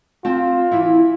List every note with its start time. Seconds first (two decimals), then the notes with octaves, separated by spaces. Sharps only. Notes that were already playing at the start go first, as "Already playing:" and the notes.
0.25 C4 F4 A5
0.71 E3 E4